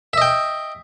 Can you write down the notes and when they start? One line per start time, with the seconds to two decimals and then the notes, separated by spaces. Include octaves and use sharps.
0.13 E5
0.17 D#5
0.22 G5